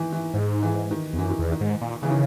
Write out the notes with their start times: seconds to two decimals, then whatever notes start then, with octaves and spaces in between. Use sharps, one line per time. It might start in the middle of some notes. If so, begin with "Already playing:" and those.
Already playing: D#3 E3
0.13 E3
0.34 G#2
0.63 E3
0.91 D#3
1.13 E2
1.18 F#2 E3
1.30 D#3
1.39 E2
1.52 D#3
1.61 G#2
1.81 A#2
2.02 C#3 E3
2.11 D#3